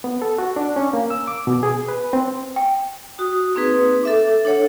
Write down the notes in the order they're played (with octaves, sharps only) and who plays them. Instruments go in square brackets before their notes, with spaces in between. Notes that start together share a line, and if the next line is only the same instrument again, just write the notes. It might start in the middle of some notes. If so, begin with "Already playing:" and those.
[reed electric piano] B3
A4
F#4
D4
C#4
A#3
E6
D6
B2
G#4
B4
C4
[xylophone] G5
[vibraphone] F#4 D#6
A#3 C4 D#4 G#4 B4
A4 E5 D6
D4 A4 C#5 F#5